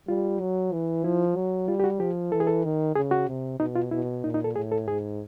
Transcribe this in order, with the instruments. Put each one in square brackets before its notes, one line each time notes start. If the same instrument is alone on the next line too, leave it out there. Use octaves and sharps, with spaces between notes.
[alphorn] G3 [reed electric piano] F4
[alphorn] F#3
E3
[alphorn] F3 [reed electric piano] E4
[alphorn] F#3
[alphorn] G3 [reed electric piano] F4
[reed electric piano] G4
F#4
[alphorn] F3 [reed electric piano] G4
[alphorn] E3 [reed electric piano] A4
[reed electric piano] G#4
A4
[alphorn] D#3
[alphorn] C#3 [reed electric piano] G#4
[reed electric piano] F#4
[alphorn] C3
[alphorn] B2 [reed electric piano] D#4
[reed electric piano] F4
[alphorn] B2 [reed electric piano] E4
[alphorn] A#2 [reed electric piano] D#4
[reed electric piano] D#4
A4
[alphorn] A2 [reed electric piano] G#4
[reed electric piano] A4
[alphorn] G#2 [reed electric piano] G#4